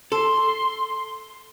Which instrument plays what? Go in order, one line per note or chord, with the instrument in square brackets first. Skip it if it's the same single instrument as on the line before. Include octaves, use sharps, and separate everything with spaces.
[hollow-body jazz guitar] A4 [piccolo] C6